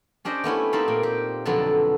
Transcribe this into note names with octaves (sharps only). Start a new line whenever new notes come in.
C#4 D4 G4 C5 D#5
A3 B3 C#4 E4
C4 D#4 G4 A4 F5 B5
A#2
G4
F2 B2 D3 F#3 B3 A4